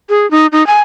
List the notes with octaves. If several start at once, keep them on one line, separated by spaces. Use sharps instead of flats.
G#4
D#4
D#4
G#5